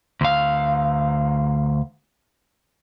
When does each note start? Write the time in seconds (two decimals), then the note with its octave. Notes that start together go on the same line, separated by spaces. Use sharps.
0.21 D2 F5